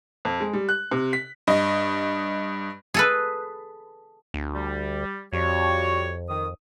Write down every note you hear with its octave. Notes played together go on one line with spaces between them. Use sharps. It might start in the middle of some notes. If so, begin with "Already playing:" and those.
F2
G#3
G3
F#6
C3
B6
G2 D#5
G#4 A4 B4
D2
G3
F2 G3 F#4 C#5
D#3 D#6